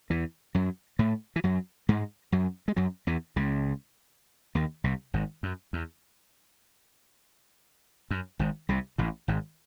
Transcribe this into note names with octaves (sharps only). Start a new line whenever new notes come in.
E2 E3
F#2 F#3
A2 A3
E3
F#2 F#3
G#2 G#3
F#2 F#3
G#3
F#2 F#3
E2 E3
C#2 C#3
D#2 D#3
C2 C3
G#1 G#2
F#2
E2
F#2
G#1 G#2
C2 C3
A1 A2
G#1 G#2